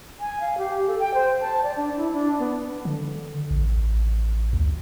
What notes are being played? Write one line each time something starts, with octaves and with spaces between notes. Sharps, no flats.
G#5
F5
G4
A4
G5
C5
A5
D5
D4
E4
D4
B3
D3
A1
D2